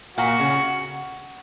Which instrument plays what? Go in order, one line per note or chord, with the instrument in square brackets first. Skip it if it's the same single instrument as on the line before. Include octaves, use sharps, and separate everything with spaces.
[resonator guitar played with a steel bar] A#2 [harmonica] F#4
[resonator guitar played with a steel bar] C#3